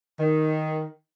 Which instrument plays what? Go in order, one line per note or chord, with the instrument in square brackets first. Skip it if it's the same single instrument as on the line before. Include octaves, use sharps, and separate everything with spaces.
[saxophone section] D#3